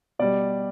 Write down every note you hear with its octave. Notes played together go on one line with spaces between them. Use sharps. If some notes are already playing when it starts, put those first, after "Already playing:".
B2 G3 D5